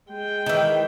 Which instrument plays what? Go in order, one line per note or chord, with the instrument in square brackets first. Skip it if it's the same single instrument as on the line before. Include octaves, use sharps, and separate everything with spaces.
[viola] G#3 G5
[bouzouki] D#3 E3